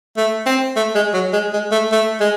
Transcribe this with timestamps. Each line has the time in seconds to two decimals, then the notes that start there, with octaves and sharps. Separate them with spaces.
0.17 A3
0.46 C4
0.76 A3
0.95 G#3
1.13 F#3
1.33 G#3
1.53 G#3
1.71 A3
1.92 A3
2.20 G#3